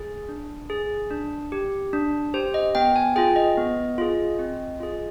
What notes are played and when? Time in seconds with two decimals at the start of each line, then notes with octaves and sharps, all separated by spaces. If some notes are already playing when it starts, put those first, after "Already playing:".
Already playing: G#4
0.29 D4
0.70 G#4
1.11 D4
1.52 G4
1.93 D4
2.34 G4 C5
2.54 D#5
2.75 B3 G5
2.96 G#5
3.16 F4 G#4 G5
3.36 D#5
3.57 B3
3.98 F4 G#4
4.39 C4
4.80 F4 G#4